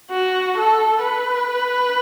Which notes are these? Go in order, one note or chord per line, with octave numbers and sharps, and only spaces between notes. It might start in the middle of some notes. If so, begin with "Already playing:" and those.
F#4
A4
B4